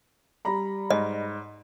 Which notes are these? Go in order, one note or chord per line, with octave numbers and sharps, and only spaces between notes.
G3 A#5 B5
G#2 D#5